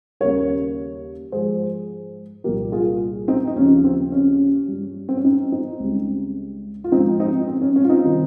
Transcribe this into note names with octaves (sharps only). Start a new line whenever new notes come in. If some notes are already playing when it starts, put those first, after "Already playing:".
D#2 C#3 G3 A#4 C#5
G#2 F3 G#4 C5
C2 A#2 G3 G4 A#4
F4 G#4
C4 D#4
D#4
D#2 C#3 F3 C#4
C4
C#4
G2 G3
C4
C#4
C4 D#4
C4 D#4
C#2 C#3 G3
F4
G#2 F3 C4 D#4
C4 D#4
C4
C#4
C#4
F4
C4 D#4
C3 D#3 G3